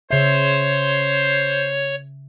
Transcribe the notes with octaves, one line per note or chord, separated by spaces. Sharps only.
C#3 C5 C#5 E5